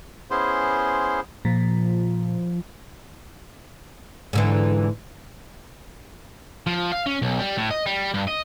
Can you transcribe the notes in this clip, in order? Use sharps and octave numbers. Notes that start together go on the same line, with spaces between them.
B3 C#4 E4 G#4 C5 C6
A#2 F3
G#2 D3 E3
F3
F5
C#4
B1
G3
A2
D#5
G3
G2
D#5